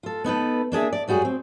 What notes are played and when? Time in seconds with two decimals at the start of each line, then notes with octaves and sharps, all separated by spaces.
0.03 F4 A4
0.24 B3 D#4 A4 B4
0.72 A#3 D4 G#4 E5
0.93 D5
1.08 F#2 G3 F#4 G#4
1.25 C4